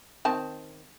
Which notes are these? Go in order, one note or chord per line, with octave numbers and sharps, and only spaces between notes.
D#3 C4 A5